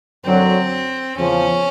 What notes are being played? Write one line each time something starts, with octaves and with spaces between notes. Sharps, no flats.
F#2 D3 F#3 C4
E2 C#3 F3 C#4